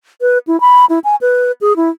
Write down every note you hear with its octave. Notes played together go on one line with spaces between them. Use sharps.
B4
E4
B5
E4
G#5
B4
G#4
E4